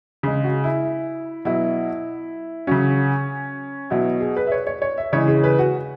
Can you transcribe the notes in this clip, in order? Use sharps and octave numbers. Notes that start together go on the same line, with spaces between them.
C#3 G#3 G#4
F#4
E4
B2 F#3 E4
C#3 F#3 C#4
B2 F#3 E4
G#4
B4
E5
C#5
C#5
C#5
E5
C#3 E3 G#3 C#5
G#4
B4
F#4